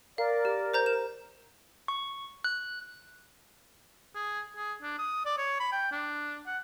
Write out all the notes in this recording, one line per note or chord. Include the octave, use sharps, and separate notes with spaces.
A#4 D5 F5
G4
C5 A#5 G6
E7
C#6
F#6
G#4
G#4
D4
D#6
D5
C#5
B5
G5
D4
F#5